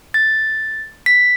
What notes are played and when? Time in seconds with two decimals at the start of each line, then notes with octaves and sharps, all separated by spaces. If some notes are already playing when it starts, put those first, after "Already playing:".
0.14 A6
1.06 B6